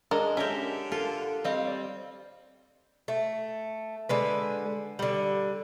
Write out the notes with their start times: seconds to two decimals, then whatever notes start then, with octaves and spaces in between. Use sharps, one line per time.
0.11 G#3 D4 A4 A#4
0.37 D3 C#4 G4 A#4 E5
0.92 F4 A4 A#4
1.44 G3 C4 D#5 F5
1.63 C#5 D5
3.08 A3
4.09 D3 G#3 B4
4.99 D3 G3